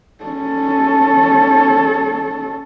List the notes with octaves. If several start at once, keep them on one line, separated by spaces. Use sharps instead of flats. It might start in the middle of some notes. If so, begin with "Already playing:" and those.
C#4 A4